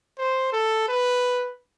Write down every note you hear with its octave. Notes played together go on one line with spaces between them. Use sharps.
C5
A4
B4